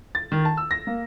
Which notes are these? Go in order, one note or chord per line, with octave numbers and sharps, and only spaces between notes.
A6
D#3
A5
E6
A#6
A#3